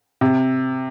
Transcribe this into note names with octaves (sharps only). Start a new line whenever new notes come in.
C3